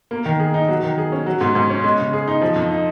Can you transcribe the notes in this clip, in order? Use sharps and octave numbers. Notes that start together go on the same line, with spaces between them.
A#3
D#3
G#4
D#4
F#3
D#3
G#4
C#4
F#3
G#2
G#2
C#4
G#3
C#3
G#4
D#4
F3
F2
D#4